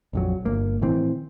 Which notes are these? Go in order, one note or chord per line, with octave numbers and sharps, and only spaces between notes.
A#1 F2 F#3
G1 A#3
A2 D#3 E3 C4